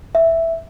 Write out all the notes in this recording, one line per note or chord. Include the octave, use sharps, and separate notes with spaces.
E5